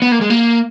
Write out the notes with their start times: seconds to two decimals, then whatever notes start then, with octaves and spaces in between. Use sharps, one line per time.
0.02 B3
0.12 A#3
0.21 G#3
0.30 A#3